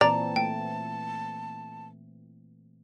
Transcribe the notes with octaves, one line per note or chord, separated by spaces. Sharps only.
A#2 E3 C4 D5 A5 A#5
A3 G5